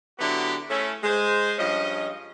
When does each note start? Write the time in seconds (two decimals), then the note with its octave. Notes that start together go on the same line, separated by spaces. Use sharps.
0.19 D3 F#3 B3 E4 F#4 G4
0.70 A3 C#4 E4
1.04 G#3 C5
1.58 G2 F3 C#4 D#5